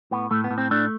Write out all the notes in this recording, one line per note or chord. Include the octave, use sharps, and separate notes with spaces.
A2 B3
A2 A3
B3
A2
C4
A3 D4